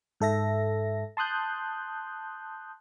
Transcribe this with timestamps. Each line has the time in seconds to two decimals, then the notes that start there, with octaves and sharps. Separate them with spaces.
0.20 G#2 A4 E5 A#6
1.17 A5 C6 D#6 F#6 G6